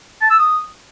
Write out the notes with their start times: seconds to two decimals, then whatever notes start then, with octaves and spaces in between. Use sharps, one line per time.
0.21 A5
0.30 E6
0.39 D#6